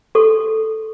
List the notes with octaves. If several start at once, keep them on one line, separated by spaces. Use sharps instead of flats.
F#4 A4 C#6